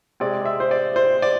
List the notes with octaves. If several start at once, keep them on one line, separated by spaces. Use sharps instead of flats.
C3 G#3 C4 D5
E5
C5
D5
C5
D5